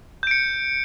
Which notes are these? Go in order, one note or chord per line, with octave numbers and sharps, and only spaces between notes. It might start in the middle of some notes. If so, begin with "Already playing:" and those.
G6 C#7 D7